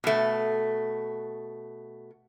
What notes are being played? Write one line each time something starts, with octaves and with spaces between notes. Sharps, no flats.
B2 A3